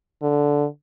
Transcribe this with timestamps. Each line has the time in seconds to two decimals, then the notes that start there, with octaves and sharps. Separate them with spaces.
0.22 D3